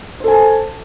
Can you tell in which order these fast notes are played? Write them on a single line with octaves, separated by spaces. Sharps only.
C5 A4 G#5 A5